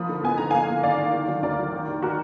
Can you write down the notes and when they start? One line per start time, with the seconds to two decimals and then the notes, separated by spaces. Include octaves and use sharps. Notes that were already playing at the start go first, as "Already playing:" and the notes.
Already playing: F3 A#3 B5 D#6
0.09 D3
0.23 B3 G#5
0.38 D3 A#5
0.51 A#3 F5 G#5
0.68 A#3
0.83 D#3 D5 F5
0.98 D#3
1.13 D3
1.28 F#3
1.43 D2 A#4 D5
1.59 F#3
1.72 D#3
1.87 D#2
2.02 F#4 A#4